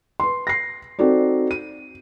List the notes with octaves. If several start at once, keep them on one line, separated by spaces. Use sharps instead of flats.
B4 C6
A#6 C7
C4 D#4 F#4 A4 D5
D#7